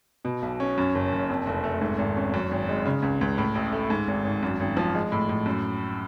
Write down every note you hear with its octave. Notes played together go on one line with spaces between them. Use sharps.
B2
B1
C#4
F#2
F#1
F#1
F2
F1
A3
G#2
G#1
C#4
F#2
G#1
G#3
C#3
C#2
C#2
A2
A1
A3
G#2
G#1
G#1
F#2
G#1
F3
G#3
A2
A2
F#2